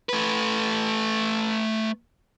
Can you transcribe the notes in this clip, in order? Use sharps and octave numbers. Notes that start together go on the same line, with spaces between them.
A3 B4